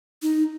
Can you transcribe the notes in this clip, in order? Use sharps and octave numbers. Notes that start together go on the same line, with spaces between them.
D#4